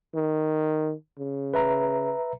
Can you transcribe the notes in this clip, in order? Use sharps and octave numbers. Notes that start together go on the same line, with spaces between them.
D#3
C#3
B4 E5 A#5